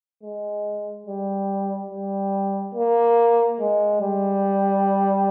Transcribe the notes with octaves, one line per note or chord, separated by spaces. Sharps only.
G#3
G3
G3
A#3
G#3
G3